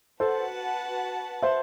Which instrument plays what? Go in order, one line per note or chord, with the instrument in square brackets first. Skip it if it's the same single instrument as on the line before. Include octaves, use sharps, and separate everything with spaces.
[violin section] F#4 B4 F#5 A5 [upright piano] A4 C5
[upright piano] C5 E5